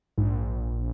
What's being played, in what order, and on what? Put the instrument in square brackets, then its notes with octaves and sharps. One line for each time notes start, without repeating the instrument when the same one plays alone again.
[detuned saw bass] A#1 [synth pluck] G#2